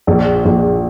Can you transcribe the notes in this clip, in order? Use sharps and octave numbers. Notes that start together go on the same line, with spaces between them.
A#1
A#1